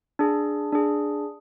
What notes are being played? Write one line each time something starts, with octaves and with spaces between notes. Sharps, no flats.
D4 G#4
D4 G#4